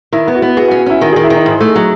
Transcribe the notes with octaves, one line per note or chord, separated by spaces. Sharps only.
D#3 E4
B3 E4
F#4
B3
F#4 G#4
F#4
C#4
F#4
C#4 E4
D#3 F#4
G#4
D#3
E4
D#3 D#4
G#2
A3
F#3